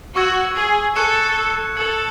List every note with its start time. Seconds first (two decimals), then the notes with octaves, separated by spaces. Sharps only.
0.15 F#4 C#6 E6 G#6
0.55 G#4
0.96 A4 C#6 F#6 C#7 E7
1.77 A4 G#6 C#7 F#7